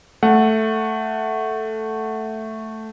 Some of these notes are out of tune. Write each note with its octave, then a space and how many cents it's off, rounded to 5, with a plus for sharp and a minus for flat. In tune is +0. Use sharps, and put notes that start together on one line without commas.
A3 +0 F#5 +0